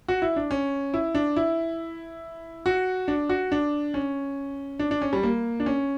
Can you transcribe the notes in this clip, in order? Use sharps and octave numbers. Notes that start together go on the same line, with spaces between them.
F#4
E4
D4
C#4
E4
D4
E4
F#4
D4
F#4
D4
C#4
D4
D4
C#4
G3
A#3
D4
C#4